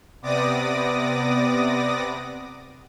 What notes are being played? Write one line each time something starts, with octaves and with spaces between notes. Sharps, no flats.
C3 B3 D5 D6 D#6 A#6